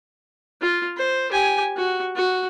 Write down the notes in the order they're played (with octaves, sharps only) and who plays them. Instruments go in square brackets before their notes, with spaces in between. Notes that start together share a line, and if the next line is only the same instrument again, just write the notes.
[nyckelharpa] F4
C5
G4 G#5
F#4
F#4